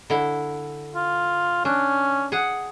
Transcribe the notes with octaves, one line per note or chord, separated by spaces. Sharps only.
D3 E4
F4
C#4 D4
G#4 F#5